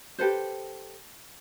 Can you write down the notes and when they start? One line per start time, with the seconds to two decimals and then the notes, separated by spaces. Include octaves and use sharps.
0.19 G4 A4 B4 C5